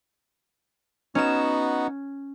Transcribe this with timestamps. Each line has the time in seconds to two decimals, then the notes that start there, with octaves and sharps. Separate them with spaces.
1.15 B3 C#4 D#4 F#4 E7